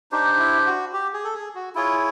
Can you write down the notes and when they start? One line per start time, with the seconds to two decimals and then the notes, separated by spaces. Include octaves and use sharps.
0.12 D4 D#4 G4 C5
0.39 E4
0.66 F#4
0.93 G4
1.14 G#4
1.24 A4
1.34 G#4
1.55 F#4
1.75 E4 F4 G#4 C#5